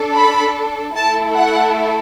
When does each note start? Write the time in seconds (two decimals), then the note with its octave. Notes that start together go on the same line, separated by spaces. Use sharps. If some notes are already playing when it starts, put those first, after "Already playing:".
Already playing: D4 A4
0.17 B5
0.96 A3 E4 A4 A5
1.35 F#5